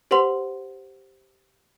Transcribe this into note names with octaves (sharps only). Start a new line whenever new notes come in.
G4 B4 C5 F#5 C6